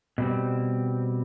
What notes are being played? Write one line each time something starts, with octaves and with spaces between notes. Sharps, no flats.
B2 G3 C4